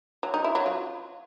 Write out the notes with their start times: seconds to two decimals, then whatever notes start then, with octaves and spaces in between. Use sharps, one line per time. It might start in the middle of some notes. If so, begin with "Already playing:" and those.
0.23 F#3
0.34 D#4
0.44 E4
0.55 F#3
0.66 F4